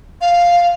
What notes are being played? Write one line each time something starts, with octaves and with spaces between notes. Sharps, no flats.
F5